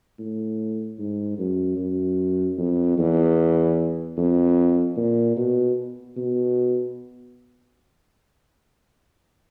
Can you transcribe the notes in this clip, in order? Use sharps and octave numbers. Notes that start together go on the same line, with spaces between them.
A2
G#2
F#2
F#2
F2
E2
F2
A#2
B2
B2